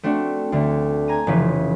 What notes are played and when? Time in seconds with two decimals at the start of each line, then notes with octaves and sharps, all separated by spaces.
0.03 A3 C4 D4 F#4
0.52 D2 D3 A3
1.08 G#5 A#5 D#7
1.27 F1 C#3 E3 F3 B6